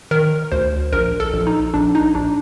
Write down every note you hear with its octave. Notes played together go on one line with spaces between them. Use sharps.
D#3 A#4
D2 C5
A#1 A#4
A4
A#1
D#4
A#1 D4
D#4
A#1 D4